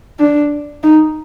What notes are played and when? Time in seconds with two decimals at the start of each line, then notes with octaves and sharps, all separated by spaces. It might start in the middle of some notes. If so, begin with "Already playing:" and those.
0.19 D4
0.83 D#4